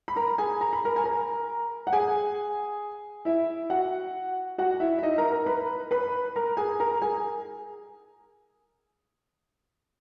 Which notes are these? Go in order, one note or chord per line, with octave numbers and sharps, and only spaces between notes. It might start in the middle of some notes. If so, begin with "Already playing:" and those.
B5
A#4 A#5
G#4 G#5
A#5
B5
A#4 A#5
G#5
A#4 A#5
F#5
G#4 G#5
E4 E5
F#4 F#5
F#4 F#5
E4 E5
E5
D#4 D#5
A#4 A#5
A#4 A#5
B4 B5
B4 B5
A#4 A#5
G#4 G#5
A#4 A#5
G#4 G#5